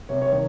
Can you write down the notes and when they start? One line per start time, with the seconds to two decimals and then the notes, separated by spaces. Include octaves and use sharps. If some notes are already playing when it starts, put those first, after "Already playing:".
0.09 C3 C#5
0.22 C#5
0.33 D#3 C#5